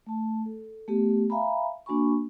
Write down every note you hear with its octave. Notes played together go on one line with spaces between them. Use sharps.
A3 A5
A4
A3 B3 G4
E5 F5 G#5 A#5 B5
A#3 D4 F#4 G#5 B5 C#6